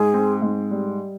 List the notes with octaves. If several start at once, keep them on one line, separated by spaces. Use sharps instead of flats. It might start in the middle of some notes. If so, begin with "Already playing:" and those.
Already playing: G#2 G#4
C4
G#2
G3